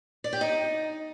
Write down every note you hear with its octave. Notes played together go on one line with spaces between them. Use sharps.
D5
G4
D#4